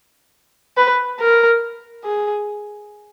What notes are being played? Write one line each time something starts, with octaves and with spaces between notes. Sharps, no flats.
B4
A#4
G#4